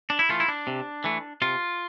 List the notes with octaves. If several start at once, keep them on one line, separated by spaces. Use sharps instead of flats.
D4
E4
E3 A3 F4
E4
D4
C3
E3 A3
C3 F4